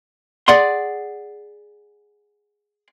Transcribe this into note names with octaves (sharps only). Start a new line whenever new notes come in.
G#4 D5 F#5 C6